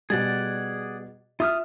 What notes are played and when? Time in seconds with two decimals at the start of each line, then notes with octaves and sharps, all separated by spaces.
0.10 B2 G3 G#4 D5 F#5
1.40 F4 E5 D#6 F6